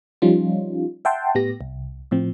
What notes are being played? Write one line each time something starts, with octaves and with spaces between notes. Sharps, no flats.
F3 G3 C#4 D#4 F4
E5 F#5 G5 A5 C6
A2 B3 G4 A#6
C2
A2 F3 C4